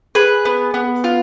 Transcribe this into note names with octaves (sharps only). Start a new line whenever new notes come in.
G#4 B4
B3
B3
F4